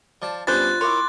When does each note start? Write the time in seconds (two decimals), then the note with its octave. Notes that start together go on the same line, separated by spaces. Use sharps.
0.22 F3 D5 A5
0.47 G3 B3 C#4 D4 F4 C5 F#6 A6
0.81 E4 A#4 C#5 C6 D6